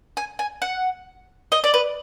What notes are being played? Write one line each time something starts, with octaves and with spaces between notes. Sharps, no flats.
G#5
G#5
F#5
D#5
D5
B4